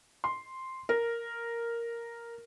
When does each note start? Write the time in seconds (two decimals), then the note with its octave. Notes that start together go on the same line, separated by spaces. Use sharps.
0.24 C6
0.89 A#4